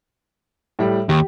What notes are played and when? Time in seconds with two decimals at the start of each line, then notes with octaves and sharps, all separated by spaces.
0.79 A2 G3
1.09 D#2 G4